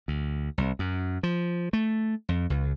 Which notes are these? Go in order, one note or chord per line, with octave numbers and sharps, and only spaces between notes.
D2
C2
F#2
F3
A3
F2
C#2